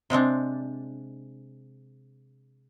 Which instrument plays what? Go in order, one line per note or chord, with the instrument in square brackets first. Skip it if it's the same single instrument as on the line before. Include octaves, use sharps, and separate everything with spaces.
[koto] C3 G#3 C4 D4